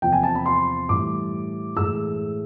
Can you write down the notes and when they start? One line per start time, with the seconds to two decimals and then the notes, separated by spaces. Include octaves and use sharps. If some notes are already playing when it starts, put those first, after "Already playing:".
0.02 E2 C3 F3 G5
0.13 G#5
0.23 A5
0.35 B5
0.46 C6
0.89 A2 E3 G3 D6
1.76 A2 E3 G#3 E6